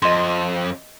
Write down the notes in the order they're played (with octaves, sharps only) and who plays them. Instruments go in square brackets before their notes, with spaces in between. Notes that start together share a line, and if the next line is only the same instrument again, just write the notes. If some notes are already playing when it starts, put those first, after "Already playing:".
[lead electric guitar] F2 [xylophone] D#5 C6